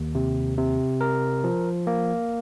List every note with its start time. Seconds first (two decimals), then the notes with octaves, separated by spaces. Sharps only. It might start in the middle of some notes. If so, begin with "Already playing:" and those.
Already playing: D#2
0.15 C3
0.58 C3
1.01 A#4
1.44 F3
1.87 A#3